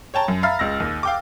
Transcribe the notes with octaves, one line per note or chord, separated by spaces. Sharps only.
C#5 G5 A5 A#5
F#2
E5 F5 A#5 B5 F6 A6
C#2 E6 A#6
D#2
F5 G5 D6